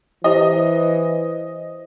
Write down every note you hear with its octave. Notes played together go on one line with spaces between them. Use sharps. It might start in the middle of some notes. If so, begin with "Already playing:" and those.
E3 E4 G4 C5 D#5